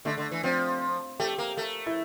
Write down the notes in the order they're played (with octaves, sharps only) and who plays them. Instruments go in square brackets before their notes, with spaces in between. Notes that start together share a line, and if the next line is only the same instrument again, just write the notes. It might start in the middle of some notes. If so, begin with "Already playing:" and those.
[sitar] D3 [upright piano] A3
[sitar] D3
E3
[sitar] F3 [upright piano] C4
[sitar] A3 [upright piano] G4
[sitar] A#3
A3
[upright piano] E4